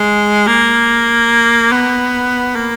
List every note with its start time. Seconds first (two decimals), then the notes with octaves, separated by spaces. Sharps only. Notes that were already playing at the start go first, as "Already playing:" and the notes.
Already playing: G#3
0.47 A#3
1.72 B3
2.55 A#3